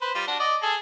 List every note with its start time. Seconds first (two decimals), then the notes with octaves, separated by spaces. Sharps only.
0.02 B4 C5
0.15 G3 F4
0.27 D4 F#4
0.40 D5 D#5
0.62 G#4 A4